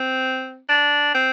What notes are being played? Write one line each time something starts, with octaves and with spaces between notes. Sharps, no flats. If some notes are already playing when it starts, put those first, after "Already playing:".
Already playing: C4
D4
C4